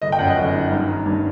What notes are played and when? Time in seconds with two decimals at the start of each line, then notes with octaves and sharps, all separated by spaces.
0.01 G1 D#5
0.12 G5
0.18 F#2 F#5
0.28 D#5
0.36 G1
0.54 D#3
0.71 G2
0.89 D#3
1.06 G2